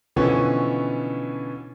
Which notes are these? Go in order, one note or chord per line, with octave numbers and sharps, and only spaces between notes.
B2 D3 E3 F3 B3 C#4